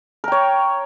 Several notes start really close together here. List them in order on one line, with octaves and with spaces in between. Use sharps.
A#4 G5 C#5